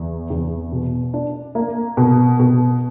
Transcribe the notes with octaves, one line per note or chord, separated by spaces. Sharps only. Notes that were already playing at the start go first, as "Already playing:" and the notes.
Already playing: E2
E2
B2
D4
A#3
B2
B2